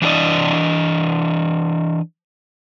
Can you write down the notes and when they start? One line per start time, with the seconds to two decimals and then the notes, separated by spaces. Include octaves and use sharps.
0.02 E3 D4 G#4 A#4 D5 D#5